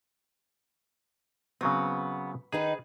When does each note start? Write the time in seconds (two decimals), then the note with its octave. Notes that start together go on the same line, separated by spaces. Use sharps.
1.61 C#3 F#3 B3 C4
2.52 D#3 D#4 G#4 B4